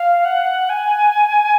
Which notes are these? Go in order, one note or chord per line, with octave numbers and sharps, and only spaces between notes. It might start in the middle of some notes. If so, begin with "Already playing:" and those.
Already playing: F5
F#5
G#5